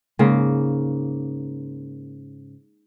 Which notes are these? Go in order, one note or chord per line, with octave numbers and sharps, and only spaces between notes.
G#2 C#3 A#3